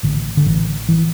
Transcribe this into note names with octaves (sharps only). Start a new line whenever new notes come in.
A1 D3
D3
A1 E3
E3